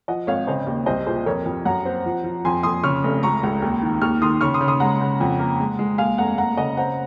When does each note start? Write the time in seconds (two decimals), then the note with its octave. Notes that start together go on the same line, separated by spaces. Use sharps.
0.08 F3 D#5 F#5
0.27 G#1 C#5 F5
0.47 C#3 C5 D#5
0.67 D#2
0.86 C2 C5 D#5
1.06 A#2 G#4 C5
1.26 F2 A#4 C#5
1.46 F2
1.65 F#2 F#5 A#5
1.85 C4
2.06 F3
2.24 F3
2.45 F2 G#5 C6
2.63 F2 C6 D#6
2.83 C#3 C#6 F6
3.04 F1
3.23 C#2 A#5 C#6
3.43 C#2
3.62 D#2
3.83 D#3
4.01 D#2 C#6 F6
4.22 D#3 C6 D#6
4.41 C#3 C#6 F6
4.54 C6 D#6
4.61 C#3
4.68 C6 D#6
4.80 G#3 F#5 A#5
5.00 C#3
5.21 F2
5.39 A#3
5.60 G#3
5.79 G#3
5.98 D#2 F5 G#5
6.18 F1 F#5 A#5
6.37 F#1 F#5 A#5
6.57 C#3 D#5 F#5
6.77 C4 F#5 A#5